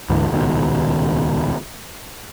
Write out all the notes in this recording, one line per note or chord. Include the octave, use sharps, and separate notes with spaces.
D2 G#2 D3 E3
D#1 C#2 B2 D#3